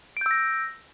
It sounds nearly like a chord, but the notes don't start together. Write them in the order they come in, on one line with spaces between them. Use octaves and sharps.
D7 G6 E6 A#6